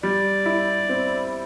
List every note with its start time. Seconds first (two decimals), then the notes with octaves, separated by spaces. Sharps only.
0.03 G3 D5
0.46 E4
0.89 C4